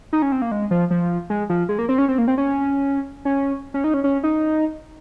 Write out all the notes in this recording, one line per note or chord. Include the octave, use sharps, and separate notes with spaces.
D#4
C#4
C4
A#3
G#3
F3
F3
G#3
F3
G#3
A#3
C4
C#4
C4
A#3
C4
C#4
C#4
C#4
D#4
C#4
C#4
D#4